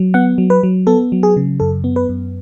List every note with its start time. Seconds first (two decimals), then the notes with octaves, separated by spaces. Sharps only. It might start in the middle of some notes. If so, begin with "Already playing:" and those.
Already playing: F#3
0.14 B3 F#5
0.38 F#3
0.50 B4
0.63 F#3
0.87 B3 A4
1.12 F#3
1.23 G#4
1.37 C#3
1.60 F#2 A4
1.84 B3
1.96 B4
2.09 F#2